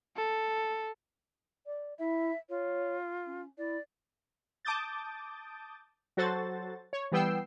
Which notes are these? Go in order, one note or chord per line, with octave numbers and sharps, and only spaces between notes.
A4
D5
E4 E5
F4 C#5
C#4
E4 D5
A5 D6 D#6 G6 A6
F#3 F#4 A4 C5 A6
C#5
E3 G3 B3 G5 E6 C7